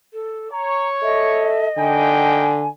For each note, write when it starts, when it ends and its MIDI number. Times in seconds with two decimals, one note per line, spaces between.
0.13 0.51 69
0.52 1.53 73
0.52 0.88 82
1.02 1.68 69
1.02 2.40 75
1.02 1.68 76
1.77 2.67 50
1.77 2.48 58
1.77 2.48 63
1.77 2.48 79
1.77 2.68 80